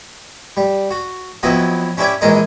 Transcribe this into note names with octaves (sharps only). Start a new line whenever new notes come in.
G3
F#4
F2 F3 F#3 B3 E4 D#5
C#4 D4 E4 G4 C#5 D5
A#1 E3 G#3 G#4 A#4 D#5